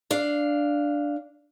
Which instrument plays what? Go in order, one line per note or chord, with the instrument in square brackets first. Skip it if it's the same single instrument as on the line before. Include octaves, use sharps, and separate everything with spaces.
[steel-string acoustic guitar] D4 F5